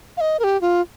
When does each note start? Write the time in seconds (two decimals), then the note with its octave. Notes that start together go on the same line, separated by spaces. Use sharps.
0.17 F5
0.21 D#5
0.40 A#4
0.44 G4
0.61 F4